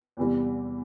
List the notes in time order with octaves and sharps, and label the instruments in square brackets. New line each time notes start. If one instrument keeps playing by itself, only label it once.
[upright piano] E2 C3 E3 G3